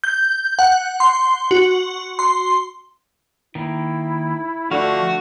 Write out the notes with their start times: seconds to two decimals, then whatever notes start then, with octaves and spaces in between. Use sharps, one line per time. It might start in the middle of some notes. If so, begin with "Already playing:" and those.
0.04 G6
0.59 F#5
1.00 C6
1.51 F#4
2.19 C6
3.55 D#3 A#3 E4
4.71 D3 F3 A3 F#4 F5